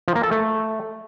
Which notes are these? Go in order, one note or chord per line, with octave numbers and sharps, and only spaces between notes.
F3
A#3
A4
A3